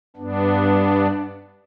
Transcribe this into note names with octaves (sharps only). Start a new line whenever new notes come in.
G2 B3 D4